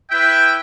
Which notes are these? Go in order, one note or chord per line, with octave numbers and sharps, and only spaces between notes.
E4 B4 E5 G5